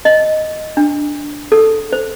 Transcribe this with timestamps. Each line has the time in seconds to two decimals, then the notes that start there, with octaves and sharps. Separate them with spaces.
0.05 D#5
0.77 D4
1.52 A4
1.93 C5